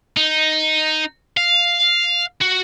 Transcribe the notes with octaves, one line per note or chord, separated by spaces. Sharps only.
D#4
F5
F#4